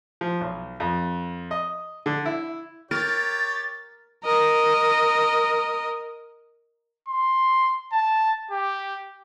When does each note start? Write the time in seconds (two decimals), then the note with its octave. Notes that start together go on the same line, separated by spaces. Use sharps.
0.21 F3
0.41 B1
0.80 F2
1.51 D#5
2.06 D3
2.26 E4
2.91 G4 A#4 C#5 G5 A6
4.24 A#4 D#5
7.09 C6
7.93 A5
8.51 G4